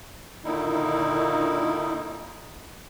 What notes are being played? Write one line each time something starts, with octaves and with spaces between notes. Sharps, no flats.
A#2 D3 D#3 D#4 E4